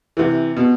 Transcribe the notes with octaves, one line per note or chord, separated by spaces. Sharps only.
C3 E3
B2